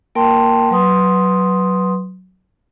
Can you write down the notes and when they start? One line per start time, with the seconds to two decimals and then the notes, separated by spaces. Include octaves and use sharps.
0.15 A#3 A#4 G5 A5 C6
0.71 F#3 B4 C6 D#6